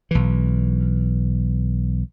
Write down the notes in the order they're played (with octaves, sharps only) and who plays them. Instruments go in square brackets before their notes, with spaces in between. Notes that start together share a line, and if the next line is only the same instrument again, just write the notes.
[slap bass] B1 E3